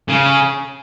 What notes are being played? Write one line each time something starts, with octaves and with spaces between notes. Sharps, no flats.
C#3